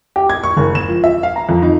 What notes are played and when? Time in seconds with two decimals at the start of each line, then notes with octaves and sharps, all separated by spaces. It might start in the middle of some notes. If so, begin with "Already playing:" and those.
0.16 G4
0.30 G#6
0.44 C#6
0.57 F#1
0.75 E7
0.88 F3
1.04 E5
1.23 F5
1.36 A#5
1.49 F2
1.62 D#4